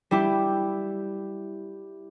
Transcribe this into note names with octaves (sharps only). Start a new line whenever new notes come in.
G3 E4 G4